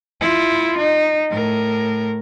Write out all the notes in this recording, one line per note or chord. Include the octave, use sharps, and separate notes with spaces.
E4 F4
D#4
A2 A#4